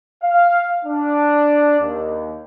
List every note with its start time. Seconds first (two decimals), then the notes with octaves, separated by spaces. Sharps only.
0.23 F5
0.85 D4
1.80 D#2